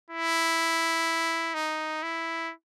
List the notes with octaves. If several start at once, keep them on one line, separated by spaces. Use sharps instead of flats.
E4
D#4
E4